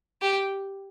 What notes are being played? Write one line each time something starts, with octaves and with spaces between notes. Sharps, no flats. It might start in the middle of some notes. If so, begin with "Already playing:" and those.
G4